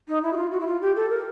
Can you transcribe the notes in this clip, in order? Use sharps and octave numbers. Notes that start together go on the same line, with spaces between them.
D#4
E4
F#4
F4
F#4
E4
F4
G4
A4
A#4